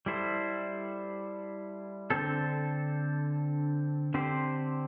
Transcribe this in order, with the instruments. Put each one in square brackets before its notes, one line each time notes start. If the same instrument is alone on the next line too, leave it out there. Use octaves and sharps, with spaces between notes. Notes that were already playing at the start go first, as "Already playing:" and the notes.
[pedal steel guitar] G3 E4 A4 C5
D3 C4 A4
D3 C4 G4 C5